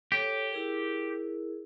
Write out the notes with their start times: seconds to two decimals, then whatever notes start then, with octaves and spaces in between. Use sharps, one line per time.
0.12 G4 A4 C#5
0.53 E4 G#4 A#4